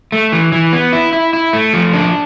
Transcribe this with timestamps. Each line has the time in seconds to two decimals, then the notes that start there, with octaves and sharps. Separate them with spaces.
0.12 A3
0.32 E3
0.52 E3
0.73 B3
0.93 E4
1.13 E4
1.33 E4
1.53 A3
1.73 F3
1.93 D4